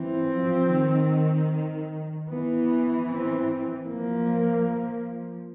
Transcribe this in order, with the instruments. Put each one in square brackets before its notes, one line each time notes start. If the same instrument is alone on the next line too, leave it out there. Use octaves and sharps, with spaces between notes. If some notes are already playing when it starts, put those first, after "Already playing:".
Already playing: [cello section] E3 [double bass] C4
[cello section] F3
D#3
[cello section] E3 [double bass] B3
[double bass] C4
[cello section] F3 [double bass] A#3